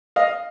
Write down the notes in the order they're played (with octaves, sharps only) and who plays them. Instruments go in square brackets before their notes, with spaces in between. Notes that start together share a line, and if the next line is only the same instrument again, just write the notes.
[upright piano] D#5 F5